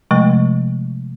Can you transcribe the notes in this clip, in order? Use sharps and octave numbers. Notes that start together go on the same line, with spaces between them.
C3 F3 G#3 A3